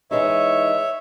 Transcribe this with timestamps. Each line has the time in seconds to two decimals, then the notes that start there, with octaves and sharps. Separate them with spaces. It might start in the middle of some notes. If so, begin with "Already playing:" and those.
0.11 E3 G#3 D#4 C#5 E5